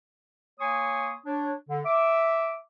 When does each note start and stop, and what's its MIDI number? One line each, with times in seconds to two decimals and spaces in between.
0.60 1.14 58
0.60 1.14 73
0.60 1.14 80
0.60 1.14 84
0.60 1.14 85
0.60 1.14 87
1.25 1.53 62
1.25 1.53 73
1.69 1.80 50
1.85 2.56 76
1.85 2.56 86